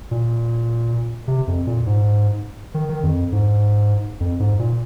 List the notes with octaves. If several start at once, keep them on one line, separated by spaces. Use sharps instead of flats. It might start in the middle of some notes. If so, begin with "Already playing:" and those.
A#2
C3
F2
A#2
G#2
D#3
D#3
F2
G#2
F2
G#2
A#2